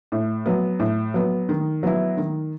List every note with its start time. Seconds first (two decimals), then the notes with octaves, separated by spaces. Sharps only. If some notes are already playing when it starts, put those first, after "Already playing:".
0.12 A2
0.46 F#3 B3
0.79 A2
1.14 F#3 B3
1.49 D#3
1.83 F#3 B3 E4
2.17 D#3